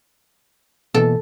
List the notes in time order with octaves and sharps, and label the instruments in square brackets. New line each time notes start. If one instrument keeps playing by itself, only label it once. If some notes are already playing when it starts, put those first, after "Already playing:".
[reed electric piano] B2 E3 A#3 [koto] A4